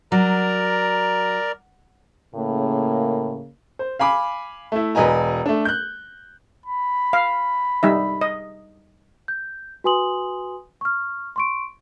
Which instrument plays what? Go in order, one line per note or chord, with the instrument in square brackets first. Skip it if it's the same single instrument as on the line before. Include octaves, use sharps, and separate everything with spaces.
[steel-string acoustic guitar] F#3 [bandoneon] A#4 D5 A#5
[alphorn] A2 [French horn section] C#3 A#3
[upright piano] C5
F5 G#5 B5 D6
A3 E4
E1 B4 D#5 G#5 A#5
A3 D4
F#6 G6
[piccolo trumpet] B5
[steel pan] F5
G3 D#4 E5
D#5
[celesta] G6
F#4 B4 G#5 C6 D#6 F#7
C#6 F6
C6 C#6 D7